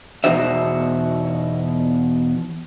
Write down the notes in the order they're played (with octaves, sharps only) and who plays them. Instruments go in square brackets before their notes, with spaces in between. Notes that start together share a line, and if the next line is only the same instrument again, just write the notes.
[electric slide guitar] E2 B2 D#4 F#4 C5 E5